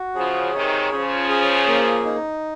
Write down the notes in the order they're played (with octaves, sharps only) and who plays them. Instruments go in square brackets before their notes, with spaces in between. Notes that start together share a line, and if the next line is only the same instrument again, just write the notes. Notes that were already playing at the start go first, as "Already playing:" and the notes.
Already playing: [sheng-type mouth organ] F#4
[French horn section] C#3 F3 [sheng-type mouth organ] G#4
[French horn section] C3 D#3 [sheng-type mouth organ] C#5
[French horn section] C#3 F3 [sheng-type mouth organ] C#4
[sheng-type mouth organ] G#4
A#3
D#4